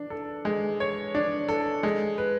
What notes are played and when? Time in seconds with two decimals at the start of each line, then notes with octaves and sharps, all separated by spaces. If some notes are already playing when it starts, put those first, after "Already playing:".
Already playing: D4
0.10 A4
0.45 G#3
0.80 C#5
1.15 D4
1.49 A4
1.83 G#3
2.18 B4